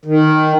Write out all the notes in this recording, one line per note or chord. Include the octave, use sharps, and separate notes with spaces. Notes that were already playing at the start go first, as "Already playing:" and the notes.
D#3